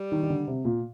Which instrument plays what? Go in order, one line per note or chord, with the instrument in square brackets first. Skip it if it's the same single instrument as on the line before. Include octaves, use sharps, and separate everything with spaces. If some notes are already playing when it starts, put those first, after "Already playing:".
Already playing: [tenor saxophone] G3
[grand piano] D#3
D#3
D3
C3
A#2